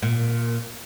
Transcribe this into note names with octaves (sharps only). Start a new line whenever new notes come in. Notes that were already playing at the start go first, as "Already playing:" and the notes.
A#2